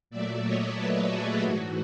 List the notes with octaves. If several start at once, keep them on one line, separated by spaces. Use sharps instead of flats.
A#2 F#3 A3 D5 E5
C#5 D#5
A4 B4
F#4 G#4
G#2 E3 A3 F#4